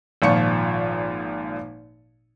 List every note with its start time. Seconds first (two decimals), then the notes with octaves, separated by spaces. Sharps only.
0.22 G#1 A#2 F3 C#6 C#7